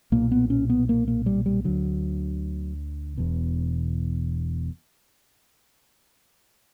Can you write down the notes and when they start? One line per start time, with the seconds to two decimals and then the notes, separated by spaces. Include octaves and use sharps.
0.12 B1 A#2 A#3
0.31 B3
0.50 C#4
0.69 B3
0.89 A#3
1.08 A#3
1.26 G3
1.46 G3
1.64 D2 D3 F#3
3.17 E1 E2 B2